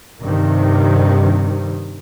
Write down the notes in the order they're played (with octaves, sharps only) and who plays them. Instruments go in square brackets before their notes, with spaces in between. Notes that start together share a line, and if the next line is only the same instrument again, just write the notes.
[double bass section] G2 C3 D#3